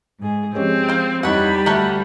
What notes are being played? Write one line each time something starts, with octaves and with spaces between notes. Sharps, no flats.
G#2 G#4
F3 G#3 C4 C#4 G4
C5 F5
E2 G3 D#4 C#5 F#5 B5
D2 F#4 A4 A#4 E5